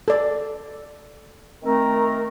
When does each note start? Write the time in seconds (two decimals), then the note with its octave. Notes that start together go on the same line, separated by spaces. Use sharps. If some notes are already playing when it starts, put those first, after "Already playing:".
0.08 A4 D5
1.63 D#3 A3 C4 A#4